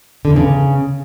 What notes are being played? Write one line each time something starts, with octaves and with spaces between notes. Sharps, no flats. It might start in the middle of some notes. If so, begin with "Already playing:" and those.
D3
E2
C#3